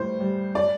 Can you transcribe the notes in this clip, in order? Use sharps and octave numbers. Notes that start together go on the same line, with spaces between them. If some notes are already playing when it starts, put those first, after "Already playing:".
Already playing: A2 G3 C5
G3
D5